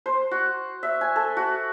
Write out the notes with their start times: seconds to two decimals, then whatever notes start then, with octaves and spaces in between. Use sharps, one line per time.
0.06 C5
0.31 F#4
0.83 E5
1.01 G#5
1.16 A4
1.37 F#4